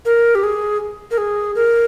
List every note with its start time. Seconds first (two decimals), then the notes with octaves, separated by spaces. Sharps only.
0.05 A#4
0.35 G4
0.43 G#4
1.11 A#4
1.18 G#4
1.55 A#4